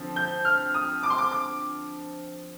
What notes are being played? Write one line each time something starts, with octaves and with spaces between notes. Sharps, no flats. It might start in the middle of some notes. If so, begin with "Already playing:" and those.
Already playing: D3 F3 C4
G6
F6
D#6
D6
C6
D6
D6